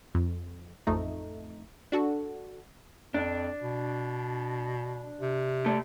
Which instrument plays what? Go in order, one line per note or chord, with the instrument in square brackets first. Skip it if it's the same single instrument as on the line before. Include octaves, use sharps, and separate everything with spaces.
[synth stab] F2
A1 F2 A3 D#4
D4 F#4 A4
[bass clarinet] F2 [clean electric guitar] D4
[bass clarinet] B2
C3
[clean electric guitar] A3 D5